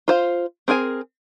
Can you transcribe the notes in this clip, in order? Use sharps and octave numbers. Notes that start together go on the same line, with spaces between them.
F4 C5 F5
C4 G#4 A#4 G#5